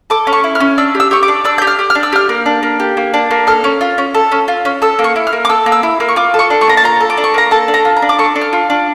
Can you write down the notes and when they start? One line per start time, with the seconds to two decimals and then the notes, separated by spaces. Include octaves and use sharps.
0.10 A4 D6
0.27 C#4
0.33 C#6
0.44 E4
0.55 F6
0.60 C#4
0.78 D4 E6
0.95 G4
1.00 E6
1.11 G4 C#6
1.23 D6
1.28 D4
1.45 D4 E6
1.58 G4 G6
1.67 F6
1.79 G4
1.90 F6
1.95 D4
2.03 E6
2.13 G4 F6
2.29 A#3
2.46 D4
2.63 A#3
2.80 G4
2.97 A#3
3.14 D4
3.31 A#3
3.47 A4 F6
3.64 C#4
3.81 F4
3.98 C#4
4.14 A4
4.32 C#4
4.48 F4
4.65 C#4
4.82 A4 E6
4.99 A#3
5.04 C#6
5.16 E4
5.27 F6
5.33 A#3
5.45 D6
5.49 A4 E6
5.66 A#3
5.72 E6
5.83 E4
6.00 A#3
6.08 C#6
6.16 F4 D6
6.34 A4
6.39 C#6
6.50 D4
6.61 C#6
6.67 A#3 A#5
6.77 A5
6.84 F4 A#5
7.00 A4
7.10 D6
7.17 D4
7.24 C#6
7.34 A#3 A#5
7.51 A4 A5
7.68 D4
7.74 A#5
7.85 F4
7.97 A#5
8.02 D4
8.09 D6
8.19 A4 C#6
8.36 D4
8.41 F6
8.53 F4
8.70 D4